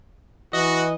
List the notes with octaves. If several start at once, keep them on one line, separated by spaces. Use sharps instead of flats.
E3 F#4 D#5